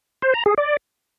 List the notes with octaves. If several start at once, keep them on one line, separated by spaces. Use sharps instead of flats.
C5
A#5
G#4
D5